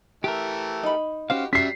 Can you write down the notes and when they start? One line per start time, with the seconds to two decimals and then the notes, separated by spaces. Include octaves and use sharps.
0.24 E3 A3 G4 A#4
0.83 D#4 B5
1.30 C#4 F#4 G4 C5 F5
1.53 F#3 G3 C#4 E5 B6 C7